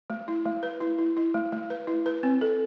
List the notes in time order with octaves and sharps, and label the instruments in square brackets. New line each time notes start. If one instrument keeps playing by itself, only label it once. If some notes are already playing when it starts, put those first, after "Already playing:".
[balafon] A3
E4
A3
B4
E4
E4
E4
A3
A3
B4
E4
B4
C4
A4